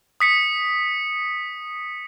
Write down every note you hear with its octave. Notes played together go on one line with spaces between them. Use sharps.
D#6 B6 C#7